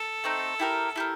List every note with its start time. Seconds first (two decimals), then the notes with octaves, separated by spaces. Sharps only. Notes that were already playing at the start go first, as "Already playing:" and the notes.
Already playing: A4
0.24 A3 C4 D#4
0.59 E4 G4 A#4
0.96 E4 G4 A#4